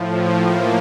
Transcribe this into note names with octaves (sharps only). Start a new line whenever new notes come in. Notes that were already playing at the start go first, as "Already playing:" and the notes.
Already playing: A2 F3
A#3